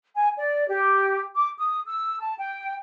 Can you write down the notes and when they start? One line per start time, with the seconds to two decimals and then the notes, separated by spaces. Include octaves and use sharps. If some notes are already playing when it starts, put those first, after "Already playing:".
0.16 G#5
0.37 D5
0.68 G4
1.35 D6
1.58 D#6
1.87 E6
2.20 A5
2.38 G5